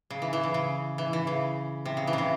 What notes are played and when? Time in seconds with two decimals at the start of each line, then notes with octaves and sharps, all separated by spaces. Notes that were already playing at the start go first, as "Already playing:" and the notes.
0.10 C#3
0.22 E3
0.33 E3
0.43 C#3
0.54 C#3
0.98 E3
1.13 E3
1.27 C#3
1.85 C3
1.97 C#3
2.07 E3
2.13 C3
2.18 C#3